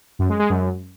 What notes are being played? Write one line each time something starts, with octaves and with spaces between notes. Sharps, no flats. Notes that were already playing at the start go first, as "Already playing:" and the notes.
F#2
G#3
G#3
F#2